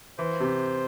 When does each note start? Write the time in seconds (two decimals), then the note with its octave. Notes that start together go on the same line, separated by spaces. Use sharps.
0.19 E3 C5
0.40 C3